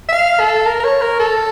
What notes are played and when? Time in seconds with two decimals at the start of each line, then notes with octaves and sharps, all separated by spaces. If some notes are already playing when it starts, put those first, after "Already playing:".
0.09 E5
0.13 F5
0.40 A4
0.66 A#4
0.80 A#4
0.84 C#5
1.02 A#4
1.20 A4